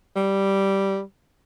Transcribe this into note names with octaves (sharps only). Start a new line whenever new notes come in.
G3